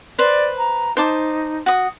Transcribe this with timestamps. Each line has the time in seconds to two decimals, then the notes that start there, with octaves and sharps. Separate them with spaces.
0.19 B4 C5 D5
0.58 A#5
0.97 D#4 C5 A5 D6
1.66 F#4 D#6